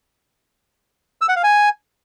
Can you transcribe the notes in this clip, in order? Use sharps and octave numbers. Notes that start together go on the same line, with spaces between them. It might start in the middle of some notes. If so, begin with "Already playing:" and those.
E6
F#5
F5
G#5